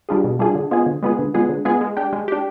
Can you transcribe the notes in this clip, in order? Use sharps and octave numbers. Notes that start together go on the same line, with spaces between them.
G3 D4 F4 G#4
B2
G3 D4 F4 G#4
D3
G#3 B3 F4 G#4
D3
G#3 B3 F4 G#4
D3
G#3 B3 F4 G#4
D3
G#3 B3 F4 G#4
G#3
D4 G4
G#3
D4 G4